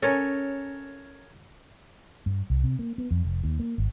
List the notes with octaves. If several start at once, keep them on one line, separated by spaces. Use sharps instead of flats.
C#4 A4 A#4 C#5
G2
C2
C3
A#3
B3
F2
F1
D#2
A#3
G#1